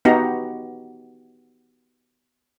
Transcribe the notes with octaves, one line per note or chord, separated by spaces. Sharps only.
B3 D#4 F#4 G4 A#5